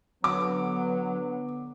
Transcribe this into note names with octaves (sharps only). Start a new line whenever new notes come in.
D3 F#3 B3 D6